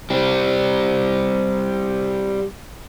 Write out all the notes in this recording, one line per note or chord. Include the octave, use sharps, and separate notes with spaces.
G3 C4